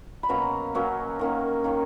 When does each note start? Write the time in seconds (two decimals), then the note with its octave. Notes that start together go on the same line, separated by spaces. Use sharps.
0.23 B5
0.29 B2 F#3 A#3 C#4 A#5
0.74 B2 F#3 A#3 C#4
1.19 D#3 A#3 C#4
1.64 D#3 A#3 C#4